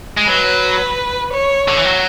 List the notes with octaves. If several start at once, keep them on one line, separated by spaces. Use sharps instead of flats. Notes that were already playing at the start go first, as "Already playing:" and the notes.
G#3
F#3 B4
C#5
D3
E3
F#3